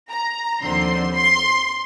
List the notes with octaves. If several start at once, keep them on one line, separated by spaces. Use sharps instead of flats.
A#5
D#2 D3 F3 C4 C6
C6